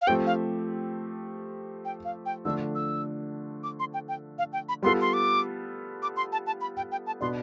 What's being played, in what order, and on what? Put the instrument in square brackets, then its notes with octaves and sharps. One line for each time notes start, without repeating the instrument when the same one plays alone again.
[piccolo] F5
[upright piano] F3 A3 C4 G4 [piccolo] G5
[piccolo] F5
G5
F5
G5
[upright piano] D3 F3 A3 D4 [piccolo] E6
[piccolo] E6
D6
C6
G5
G5
F5
G5
B5
[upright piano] G3 B3 F4 A4 [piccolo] C6
[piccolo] C6
D6
D6
C6
A5
A5
B5
G5
G5
A5
[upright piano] B2 B3 D4 [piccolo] C6